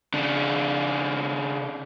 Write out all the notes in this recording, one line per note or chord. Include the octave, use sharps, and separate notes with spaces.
C#3 D4